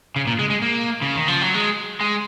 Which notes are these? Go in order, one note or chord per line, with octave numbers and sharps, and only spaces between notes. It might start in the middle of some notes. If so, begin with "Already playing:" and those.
C#3
A#2
G#3
G#3
A#3
C#3
D#3
F3
F#3
G#3
G#3